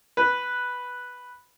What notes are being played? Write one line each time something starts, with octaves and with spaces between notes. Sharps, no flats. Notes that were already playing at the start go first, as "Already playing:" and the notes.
B4